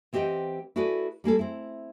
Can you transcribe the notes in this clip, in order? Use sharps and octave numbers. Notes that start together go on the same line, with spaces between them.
E3 C4 G4 C5 D#5 F#5
E4 F#4 G#4 A4 B4 D5
G3 A#3 G#4 A4
C4 E4